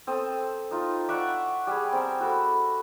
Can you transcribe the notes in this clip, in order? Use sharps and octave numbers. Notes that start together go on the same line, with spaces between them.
C4 A4 D#6
D#4 F4
D5 E5 F#5 C#6
G3 G#4
C4 A#4
F#4 A4 B5